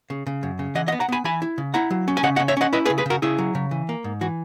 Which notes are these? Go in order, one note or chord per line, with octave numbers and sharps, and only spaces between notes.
C#3
C#3
F#2
C#3
E3 D#5 F#5
D#5 F#5
B3
F#5 A#5
B3 G#5 B5
E3 G#5 B5
E4
C#3
E4 F#5 A#5
F#3
C#4
G#5
C#3 D#5 F#5
D#5 F#5
C#4
C#5 E5
C#4 D#5 F#5
E4 B4 D#5
G#4 B4
C#3
G#4 B4
C#3 F#4 A#4
C#3 E4 G#4
F#3
C#3
E3
A#3
G#2
E3 F#4